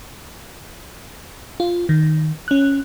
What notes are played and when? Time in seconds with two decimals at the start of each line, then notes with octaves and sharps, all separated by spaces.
1.60 F4
1.89 D#3
2.48 C#4 F#6